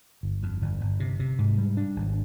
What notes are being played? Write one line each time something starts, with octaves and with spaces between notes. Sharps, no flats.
G1
F2
G1
G1
C3
C3
G#2
G3
D4
G#1